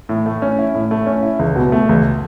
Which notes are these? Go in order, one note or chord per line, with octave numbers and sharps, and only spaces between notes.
A2
A3
C#4
E4
A2
A3
C#4
E4
C#2
B2
A3
C#2